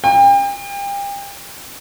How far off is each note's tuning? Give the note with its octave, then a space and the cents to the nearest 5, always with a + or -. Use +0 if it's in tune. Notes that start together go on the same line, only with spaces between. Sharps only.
G5 +35